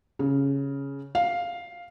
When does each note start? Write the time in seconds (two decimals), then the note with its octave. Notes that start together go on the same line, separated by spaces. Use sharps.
0.19 C#3
1.15 F5